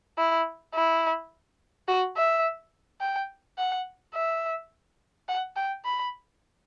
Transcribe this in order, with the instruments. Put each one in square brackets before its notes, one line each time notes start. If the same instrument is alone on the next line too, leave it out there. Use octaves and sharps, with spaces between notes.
[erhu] E4
E4
F#4
E5
G5
F#5
E5
F#5
G5
B5